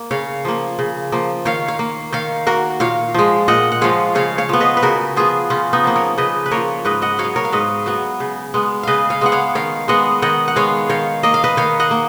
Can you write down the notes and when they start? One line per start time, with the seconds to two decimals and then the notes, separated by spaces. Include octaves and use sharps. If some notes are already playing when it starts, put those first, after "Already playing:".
Already playing: A#3
0.11 C#3 C#5 F5
0.45 F3 A#3
0.79 C#3
1.12 F3 A#3
1.45 D#3 C#5 F5
1.68 C#5 F5
1.79 A#3
2.13 D#3 C#5 F5
2.47 A#3 F#4 A#4
2.80 A#2 C#5 F5
3.14 F3 G#3
3.48 A#2 D#5 F#5
3.72 F#5
3.81 F3 G#3 C#5 F5
4.15 C#3 C#5 F5
4.38 C#5 F5
4.49 F3 B3
4.60 B4 D#5
4.77 B4
4.83 C#3 F#4 A#4
5.16 F3 B3 F4 G#4
5.50 C#3 C#4 F4
5.73 B3 D#4
5.84 F3 A#3
5.96 A#4 C#5
6.18 C#3 B4 D#5
6.46 B4
6.51 F3 A#3 A#4 C#5
6.85 G#2 B4 D#5
7.02 D#5 F#5
7.19 F#3 B3 C#5 F5
7.36 A#4 C#5
7.45 F5
7.52 G#2 B4 D#5
7.86 F#3 B3
8.20 C#3
8.54 G#3 B3
8.83 C#3 B4 D#5 F5
9.10 C#5 F5
9.21 G#3 B3 F#5
9.32 C#5 F5
9.55 D#3 C#5 F5
9.88 G#3 B3 D#5 F#5
10.22 D#3 D#5 F#5
10.48 F#5
10.56 G#3 B3 C#5 F5
10.89 D#3 C#5 F5
11.23 A#3 D#5
11.34 F5
11.44 B4 D#5
11.57 D#3 C#5 F5
11.80 D#5 F#5
11.91 A#3